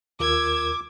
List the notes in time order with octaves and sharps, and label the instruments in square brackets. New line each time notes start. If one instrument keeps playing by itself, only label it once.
[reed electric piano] D#2 F4 A#4 [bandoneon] D6 [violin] E6 G#6